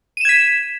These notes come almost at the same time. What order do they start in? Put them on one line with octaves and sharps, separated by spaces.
D#7 E7 G#6 B6